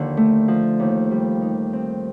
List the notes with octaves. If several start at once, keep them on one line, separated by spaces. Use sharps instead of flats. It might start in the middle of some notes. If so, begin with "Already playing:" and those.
Already playing: D#2 D3 F3
A3
F3
D#2
G3
D#4
C4